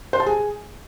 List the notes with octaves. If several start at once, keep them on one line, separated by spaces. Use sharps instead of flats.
C5
A5
G#4